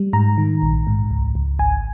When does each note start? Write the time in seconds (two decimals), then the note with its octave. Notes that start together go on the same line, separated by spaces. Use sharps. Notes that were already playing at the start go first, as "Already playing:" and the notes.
Already playing: G3
0.13 G#2 A#5
0.38 D#3
0.62 A#1
0.87 G#2
1.11 C#2
1.35 C#2
1.59 G#1 G#5